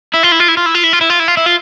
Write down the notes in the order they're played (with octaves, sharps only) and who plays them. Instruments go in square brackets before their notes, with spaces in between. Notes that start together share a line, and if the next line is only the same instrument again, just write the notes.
[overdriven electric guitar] E4
F4
E4
F4
E4
F4
E4
F4
E4
F4
E4
F4
E4
F4
E4
F4